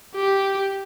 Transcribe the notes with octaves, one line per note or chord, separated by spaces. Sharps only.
G4